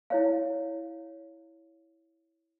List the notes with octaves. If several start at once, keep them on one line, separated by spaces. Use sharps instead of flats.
E4 C#5 F5